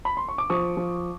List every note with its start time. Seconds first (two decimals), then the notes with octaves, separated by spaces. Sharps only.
0.05 B5
0.17 C6
0.28 C#6
0.38 D6
0.50 F3 C#6 D#6
0.77 F3